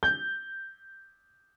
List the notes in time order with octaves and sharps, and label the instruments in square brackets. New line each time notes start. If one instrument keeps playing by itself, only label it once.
[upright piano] G6